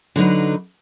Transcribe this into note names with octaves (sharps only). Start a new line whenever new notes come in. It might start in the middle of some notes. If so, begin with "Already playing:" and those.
D3 F#3 D#4 B4